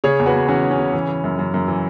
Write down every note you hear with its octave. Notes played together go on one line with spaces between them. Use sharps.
C#3 G#4 C#5
E2
F#4 B4
E2
E3 C#4 F#4
E3
C#4
C#3
E3
E3
F#2
F#2
F#2
E3